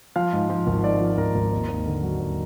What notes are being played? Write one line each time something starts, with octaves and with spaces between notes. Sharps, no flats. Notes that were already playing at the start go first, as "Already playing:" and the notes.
F3 F5
G#2
F3
G#1
G#2 D5
F3
G#1 A#4
G#1
D#2
D#2
D3
F#3
D#2